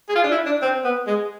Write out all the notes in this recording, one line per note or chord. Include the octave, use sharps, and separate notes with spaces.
G#4
F4
D4
E4
D4
C4
B3
G#3